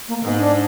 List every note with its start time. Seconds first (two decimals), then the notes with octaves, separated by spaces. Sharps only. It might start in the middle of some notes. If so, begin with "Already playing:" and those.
0.08 A#3
0.22 G#2 B3
0.38 D4